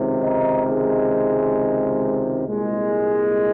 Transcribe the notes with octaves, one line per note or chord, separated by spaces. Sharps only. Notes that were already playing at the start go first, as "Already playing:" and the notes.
Already playing: C#2 C3 D#3
D#4
G#3
C2 A#2 G#3